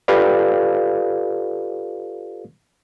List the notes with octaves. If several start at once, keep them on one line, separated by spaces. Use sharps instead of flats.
F4 G4 A4 B4 D5 F5